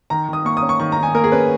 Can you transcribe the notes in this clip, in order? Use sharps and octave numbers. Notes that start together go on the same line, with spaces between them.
D#3 A#5
D#3 D#6
A#3 C#6
D#6
C#4
C#6
D#3 C#6
A#5
D#3 G#5
A#3 A#4
G#4
C#4 B4